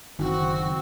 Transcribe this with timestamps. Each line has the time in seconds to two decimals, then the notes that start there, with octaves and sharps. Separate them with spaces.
0.19 F#1 D#3 C4 F#4